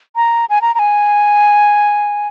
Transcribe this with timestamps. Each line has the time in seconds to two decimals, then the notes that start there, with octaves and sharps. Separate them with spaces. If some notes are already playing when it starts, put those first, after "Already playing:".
0.16 A#5
0.50 G#5
0.62 A#5
0.75 A#5
0.79 G#5